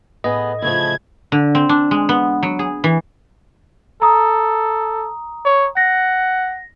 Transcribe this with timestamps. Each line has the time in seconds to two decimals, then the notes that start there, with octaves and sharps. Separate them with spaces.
0.24 A2 B3 G#4 D#5
0.62 C#3 F3 A3 E4 G#4 G#6
1.32 D3
1.55 C4
1.69 D4
1.91 G#3
2.09 B3
2.43 F#3
2.59 G#4
2.84 E3
4.02 A4 A#5 D#6
5.45 C#5
5.77 F#5 A#6